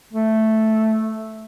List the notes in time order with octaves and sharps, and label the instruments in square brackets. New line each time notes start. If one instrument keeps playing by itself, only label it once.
[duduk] A3